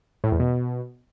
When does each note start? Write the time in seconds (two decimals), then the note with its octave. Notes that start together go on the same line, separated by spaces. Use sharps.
0.24 A2
0.32 E2
0.40 B2